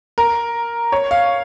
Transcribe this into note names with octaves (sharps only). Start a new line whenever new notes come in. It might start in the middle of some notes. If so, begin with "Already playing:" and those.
A#4
C#5
F5